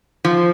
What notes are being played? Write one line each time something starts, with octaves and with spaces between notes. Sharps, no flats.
F3